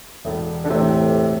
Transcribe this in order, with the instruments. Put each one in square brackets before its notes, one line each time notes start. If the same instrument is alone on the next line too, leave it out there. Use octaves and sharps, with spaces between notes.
[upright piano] E1 [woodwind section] A2
[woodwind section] D3
[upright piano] E2 E3 A3 [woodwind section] A2 C3